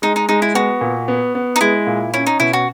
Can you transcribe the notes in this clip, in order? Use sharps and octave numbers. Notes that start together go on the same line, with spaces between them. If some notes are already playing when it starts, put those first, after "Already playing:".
G#3 D#4
D#4
G#3 D#4
E4
B3 F#4
A#2
B3
B3
D#4
G#3 E4
A#2
C#4 E4
D#4
B2 E4
F#4